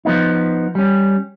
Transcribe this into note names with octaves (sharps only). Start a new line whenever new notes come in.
F3 B3 D#4
G3 C#4